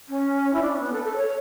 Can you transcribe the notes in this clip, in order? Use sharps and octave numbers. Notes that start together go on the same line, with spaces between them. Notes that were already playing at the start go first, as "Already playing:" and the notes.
C#4
E4
D4
C#4
B3
A4
A4
C#5